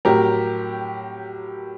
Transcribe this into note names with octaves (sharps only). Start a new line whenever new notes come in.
A2 F#3 G4 A#4